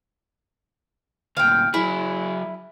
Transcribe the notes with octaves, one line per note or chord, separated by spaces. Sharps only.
D2 A#2 F5 G5
F#3 E4 G#4